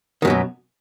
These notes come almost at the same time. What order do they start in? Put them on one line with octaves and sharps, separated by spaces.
D#3 F#2 F#3 B2